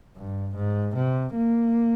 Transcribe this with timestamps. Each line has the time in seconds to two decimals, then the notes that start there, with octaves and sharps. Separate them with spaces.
0.16 G2
0.55 G#2
0.95 C3
1.35 A#3